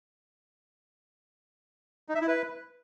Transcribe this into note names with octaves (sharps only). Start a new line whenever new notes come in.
D#4
E5
E4
B4